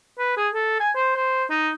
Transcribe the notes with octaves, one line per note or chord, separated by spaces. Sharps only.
B4
G#4
A4
G#5
C5
C5
D#4